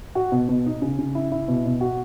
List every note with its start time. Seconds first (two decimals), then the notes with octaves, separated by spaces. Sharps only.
0.15 F#4
0.32 B2
0.49 B2
0.66 D#4
0.82 C#3
0.98 C#3
1.15 E4
1.32 E4
1.48 B2
1.65 B2
1.81 F#4